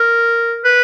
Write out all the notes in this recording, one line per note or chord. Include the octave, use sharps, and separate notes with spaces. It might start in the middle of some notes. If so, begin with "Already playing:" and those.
Already playing: A#4
B4